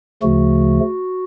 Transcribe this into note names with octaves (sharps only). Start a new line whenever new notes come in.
D2 C#3 F3 A3 F#4